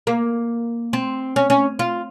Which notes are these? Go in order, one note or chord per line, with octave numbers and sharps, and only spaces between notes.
A#3
C4
C#4
C#4
F4